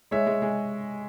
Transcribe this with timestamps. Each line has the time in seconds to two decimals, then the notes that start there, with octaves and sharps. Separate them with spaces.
0.11 G#3 C#5 E5
0.26 G#3
0.42 G#3